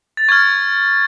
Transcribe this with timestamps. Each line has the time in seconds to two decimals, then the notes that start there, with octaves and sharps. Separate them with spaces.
0.17 A6
0.29 C#6 F6 G#6